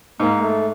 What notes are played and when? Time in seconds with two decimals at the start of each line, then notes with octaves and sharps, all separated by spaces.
0.19 G#2 A#3
0.42 A3